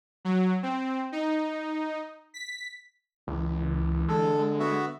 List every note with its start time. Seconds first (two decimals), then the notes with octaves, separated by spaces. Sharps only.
0.25 F#3
0.63 C4
1.12 D#4
2.34 B6
3.28 C#2 E3
4.08 D3 G#3 A4
4.60 B3 F#4 E5